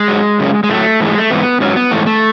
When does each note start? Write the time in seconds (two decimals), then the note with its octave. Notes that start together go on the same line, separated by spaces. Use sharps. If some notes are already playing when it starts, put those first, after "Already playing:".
Already playing: G#3
0.08 G#2 F#3
0.40 F#2 C#3
0.64 G#3
0.69 A2 F#3 A3
1.00 G#2 E3 G#3
1.18 A3
1.30 G#2 E3 B3
1.60 G#2 F#3 C#4
1.76 B3
1.91 G#2 E3 A3
2.06 A3